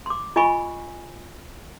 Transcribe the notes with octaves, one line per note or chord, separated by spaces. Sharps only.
C6 D6
F4 D#5 G#5 B5 C#6